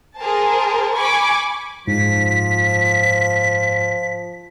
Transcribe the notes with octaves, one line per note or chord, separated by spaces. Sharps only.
G#4 A#4 C5 A5
G#5 B5 C#6 D6
G#2 F3 B6